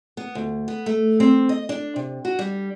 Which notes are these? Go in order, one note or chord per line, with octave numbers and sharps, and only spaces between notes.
B3
D2
B3
A3
C4
D#5
D4
C3
F#4
G3